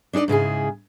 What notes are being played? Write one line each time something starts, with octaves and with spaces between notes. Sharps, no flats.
D4 D#4 F#4 D5 D#5
G#2 C#3 E4 G#4